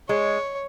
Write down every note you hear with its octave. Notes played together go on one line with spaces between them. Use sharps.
G#3 C#5